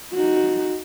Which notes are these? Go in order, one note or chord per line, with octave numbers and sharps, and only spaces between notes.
D#4 F#4